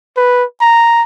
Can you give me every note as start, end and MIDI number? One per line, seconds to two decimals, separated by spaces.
0.17 0.44 71
0.61 1.03 82